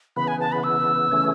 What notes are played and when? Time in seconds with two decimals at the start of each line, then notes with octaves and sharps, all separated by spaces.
0.16 C#3 E3 B3 B5
0.28 G#5
0.40 A5
0.52 B5
0.64 E6
1.12 C#3 E3 A3 C#4